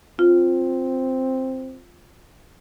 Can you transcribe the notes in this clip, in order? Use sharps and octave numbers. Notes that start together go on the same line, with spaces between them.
C4 F4